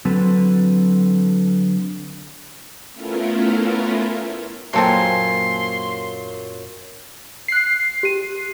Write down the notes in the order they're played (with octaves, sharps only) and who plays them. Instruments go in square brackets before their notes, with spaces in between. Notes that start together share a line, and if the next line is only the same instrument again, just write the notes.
[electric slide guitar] D3 F#3 C4 A4 B4
[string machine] A3 B3 C#4 E4 F4 A#4
[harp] F#2 A#2 G#5 [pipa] C4 A4 A#4 [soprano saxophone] C6
[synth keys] F#6 C7
[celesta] G4 D#7